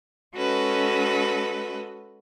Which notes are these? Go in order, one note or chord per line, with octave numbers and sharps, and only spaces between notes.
G#3 C#4 F#4 A4 B4 D#5